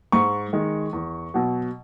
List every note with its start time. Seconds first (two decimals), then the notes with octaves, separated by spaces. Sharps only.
0.12 G#2 C#6
0.53 D#3 G#3
0.93 E2
1.34 B2 F#3